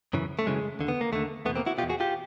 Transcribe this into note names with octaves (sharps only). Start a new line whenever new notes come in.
F#2 C#3 E3
A3
F#2 C#3 E3 G#3
D#2 D3
B3
A#3
D#2 D3 A3
E2 B2 A3 B3
A#3 C4
E4 F#4
E2 B2 F4 G4
F#4 G#4
F4 G4